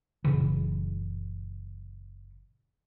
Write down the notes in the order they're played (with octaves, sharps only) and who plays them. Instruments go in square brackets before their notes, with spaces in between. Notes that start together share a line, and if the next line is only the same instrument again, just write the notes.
[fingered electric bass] F#1 A#2 C#3 E3